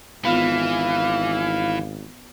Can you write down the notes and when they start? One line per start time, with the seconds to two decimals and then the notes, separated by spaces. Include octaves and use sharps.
0.25 G#1 E3 B3 F4 F5